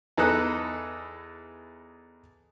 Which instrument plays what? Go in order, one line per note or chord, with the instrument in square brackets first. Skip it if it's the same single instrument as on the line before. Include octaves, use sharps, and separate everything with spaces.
[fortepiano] E2 D#4 A4 B4 D#5 F#6